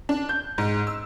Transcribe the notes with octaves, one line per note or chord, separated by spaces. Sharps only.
D4
G6
G#2
E6